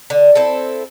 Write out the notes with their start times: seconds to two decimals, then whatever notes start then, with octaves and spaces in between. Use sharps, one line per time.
0.10 D3
0.35 C4 E4 A4